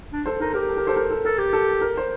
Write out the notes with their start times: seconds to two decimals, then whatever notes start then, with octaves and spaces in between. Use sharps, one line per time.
0.12 D4
0.26 A4 C5
0.40 D#4 A#4
0.54 G4 A#4
0.69 A4
0.77 A#4
0.87 A4 C5
0.96 A#4
1.11 A4
1.25 A4 A#4
1.38 G4
1.53 A4
1.81 A#4
1.97 C5